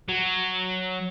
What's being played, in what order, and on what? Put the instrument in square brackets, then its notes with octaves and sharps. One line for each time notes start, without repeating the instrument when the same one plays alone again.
[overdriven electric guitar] F#3